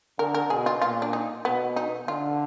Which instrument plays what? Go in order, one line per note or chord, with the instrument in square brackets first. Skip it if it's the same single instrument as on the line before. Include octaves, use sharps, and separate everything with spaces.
[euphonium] D3 [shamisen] A#4
[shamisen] A#4
[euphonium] B2 [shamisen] G#4
[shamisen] F4
[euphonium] A#2 [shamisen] F4
[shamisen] D4
D#4
[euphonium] B2 [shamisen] B3
[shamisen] D#4
[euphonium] D3 [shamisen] F4